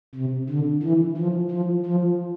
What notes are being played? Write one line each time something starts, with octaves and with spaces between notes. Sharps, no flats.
C3
D3
E3
F3
F3
F3